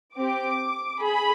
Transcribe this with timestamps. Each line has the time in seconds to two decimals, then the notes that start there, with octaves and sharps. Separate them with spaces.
0.17 C4 G4 D6
1.04 G#4 B5